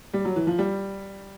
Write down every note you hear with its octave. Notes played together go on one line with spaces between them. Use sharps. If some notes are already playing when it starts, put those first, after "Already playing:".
G3
F#3
E3
F3
G3